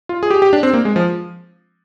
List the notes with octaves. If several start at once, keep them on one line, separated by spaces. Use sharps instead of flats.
F4
G#4
G4
G4
D4
C4
A#3
G#3
F3